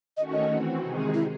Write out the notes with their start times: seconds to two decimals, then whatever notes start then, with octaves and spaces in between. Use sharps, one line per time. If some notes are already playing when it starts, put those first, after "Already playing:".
0.17 D#3 A3 C#4 F#4 C#5 D#5
0.33 D#5
0.49 E3 C4 F#4
0.82 C3 D#3 G#3 D#4 G#4
1.14 E4